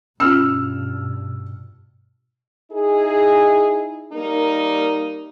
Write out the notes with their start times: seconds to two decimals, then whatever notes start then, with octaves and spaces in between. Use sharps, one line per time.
0.20 G2 B2 C#4 F4 E6 F6
2.72 D#4 E4 G#4
4.13 G3 A#3 D#4 A#4